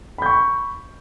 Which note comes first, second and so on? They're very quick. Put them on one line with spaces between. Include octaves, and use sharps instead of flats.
B5 G6 C#6